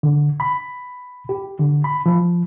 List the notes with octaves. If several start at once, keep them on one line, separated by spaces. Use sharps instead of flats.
D3
B5
G4
D3
B5
F3